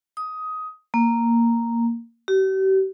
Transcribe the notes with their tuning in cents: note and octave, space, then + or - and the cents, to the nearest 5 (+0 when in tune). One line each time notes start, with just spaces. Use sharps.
D#6 +15
A#3 -5
G4 -40